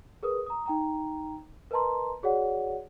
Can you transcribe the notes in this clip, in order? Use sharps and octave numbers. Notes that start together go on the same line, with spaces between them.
G#4 A#4 B4 D#6
A#5 D#6
D#4 G5 A#5
A#4 B4 D#5 A5 A#5 C6
F#4 G#4 C#5 D5 F#5